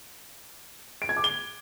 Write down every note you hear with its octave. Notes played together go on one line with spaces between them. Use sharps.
D7
G#6
D6
G7